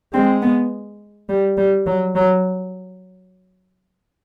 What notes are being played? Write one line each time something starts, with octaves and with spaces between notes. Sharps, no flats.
G#3 C4
B3
G3
G3
F#3
F#3